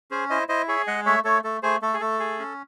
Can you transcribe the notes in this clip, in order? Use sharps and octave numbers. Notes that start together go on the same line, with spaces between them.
C#4 G#4 C5
E4 C5 D#5
E4 C5 D#5
G#4 C#5 E5
G#3 D#5 F#5
A3 C#5 E5
A3 A4 C#5
A3 A4
A3 G#4 C5
A3 A4
G#4
A3 A4
G#4
C#4